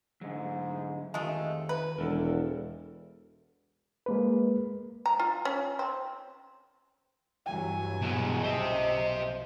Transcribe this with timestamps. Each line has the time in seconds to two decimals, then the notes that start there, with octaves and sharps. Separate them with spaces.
0.21 G#2 D3 F#3
1.14 F1 D#3 G#3 A3 F4
1.69 B4
1.98 E1 E2 A4 A#4
4.06 G#3 A#3 B4
5.06 A#5
5.20 F4
5.45 C#4
5.79 C4
7.46 G2 E3 F#3 G#5
8.02 B2 G#3
8.44 B1 F#2 F3 C5 D#5 E5